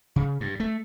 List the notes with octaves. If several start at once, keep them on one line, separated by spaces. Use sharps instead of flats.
C#3
G2
A3